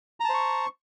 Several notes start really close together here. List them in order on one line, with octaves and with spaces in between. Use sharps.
A#5 A5 C5 C#6